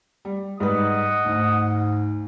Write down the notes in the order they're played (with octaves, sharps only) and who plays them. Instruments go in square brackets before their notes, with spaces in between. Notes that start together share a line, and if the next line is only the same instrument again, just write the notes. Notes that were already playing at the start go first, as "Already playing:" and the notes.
[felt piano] G3
[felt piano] G#2 G3 B4 [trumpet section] D#5 F#5 D#6
[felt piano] D2 [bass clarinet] G#2